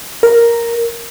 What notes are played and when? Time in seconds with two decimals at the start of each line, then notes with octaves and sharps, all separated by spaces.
0.23 A#4